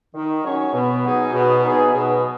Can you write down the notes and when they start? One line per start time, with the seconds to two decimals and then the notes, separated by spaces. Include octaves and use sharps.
0.14 D#3
0.44 F#3 C#4 G#4 C#5
0.74 B2
1.03 F#3 B3 D#4 G#4
1.33 B2
1.63 F#3 B3 D#4 G#4
1.93 B2